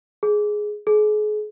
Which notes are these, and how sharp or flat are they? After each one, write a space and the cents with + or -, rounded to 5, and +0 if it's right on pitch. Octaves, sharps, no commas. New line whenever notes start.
G#4 +10
G#4 +35